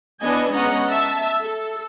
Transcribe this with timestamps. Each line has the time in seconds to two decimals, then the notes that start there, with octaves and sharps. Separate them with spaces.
0.20 E3 B3 D4 D#5 G#5
0.53 G#3 B3 C#4 D#5 F#5 A#5
0.91 E5 A5
1.41 A4